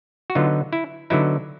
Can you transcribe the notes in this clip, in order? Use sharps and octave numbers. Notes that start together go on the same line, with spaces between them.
F#4
D3 F#3 B3 D#4 F4
E4
D3 F#3 B3 D#4 E4